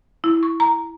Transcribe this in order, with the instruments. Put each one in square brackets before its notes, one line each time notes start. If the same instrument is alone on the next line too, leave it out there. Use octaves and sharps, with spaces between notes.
[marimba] E4
C#6
A#5